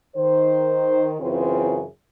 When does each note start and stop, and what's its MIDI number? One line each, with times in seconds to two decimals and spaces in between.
0.17 1.16 51
0.17 1.16 72
1.21 1.83 42
1.21 1.83 49
1.21 1.83 52
1.21 1.83 60
1.21 1.83 65
1.21 1.83 68